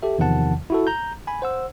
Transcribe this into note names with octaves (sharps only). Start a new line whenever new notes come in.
G4 A4 E5
E2 C3 D#3 F3 F#5 A5
E4 F#4 A4
A#5 G6
G#5 B5
C5 F#5 E6